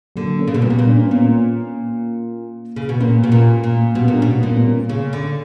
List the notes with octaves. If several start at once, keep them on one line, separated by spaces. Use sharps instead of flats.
D3 F#3 A#3
A#3 C#4
C#3
B2
A#2 G3 B3
B2
A#2
D4
C#4
B3
A#2 A#3 C#4
C#3
B2
A#2 A#3 C#4
B2
A#2
A#2
B2 G3 B3
A#2
D4
B2 A#3 C#4
A#2 G3 B3
A#3 C#4
C#3
D3